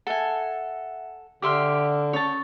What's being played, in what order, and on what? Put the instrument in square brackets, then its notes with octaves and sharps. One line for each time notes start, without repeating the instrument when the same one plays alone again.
[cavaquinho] A4 G#5 [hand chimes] E5 F#5
[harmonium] D3 [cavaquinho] G4 E5 C6 [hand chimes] D6 E6 F6
[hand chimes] C#4 C#6 A6 [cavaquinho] C#5 A5